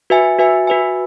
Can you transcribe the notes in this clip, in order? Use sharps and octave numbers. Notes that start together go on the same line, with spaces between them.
F#4 B4 E5 G#5
F#4 B4 E5 G#5
F#4 B4 E5 G#5